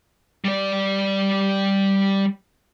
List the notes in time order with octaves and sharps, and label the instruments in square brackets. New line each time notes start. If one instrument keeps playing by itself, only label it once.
[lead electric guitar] G3 D5